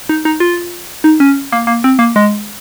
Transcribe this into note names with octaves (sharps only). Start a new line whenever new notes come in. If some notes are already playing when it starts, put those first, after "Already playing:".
D#4
D#4
F4
D#4
C#4
A#3
A#3
C4
A#3
G#3